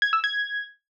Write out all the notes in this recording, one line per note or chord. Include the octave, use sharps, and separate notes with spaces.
G#6
E6
G#6